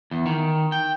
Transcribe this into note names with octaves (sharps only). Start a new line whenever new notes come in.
E2
D#3
G5